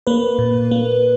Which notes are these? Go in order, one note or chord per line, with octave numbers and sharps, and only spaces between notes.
A#3 B4
A#2
A#3